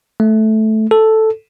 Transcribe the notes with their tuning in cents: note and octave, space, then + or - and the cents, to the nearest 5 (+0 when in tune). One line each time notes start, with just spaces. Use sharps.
A3 -10
A4 +0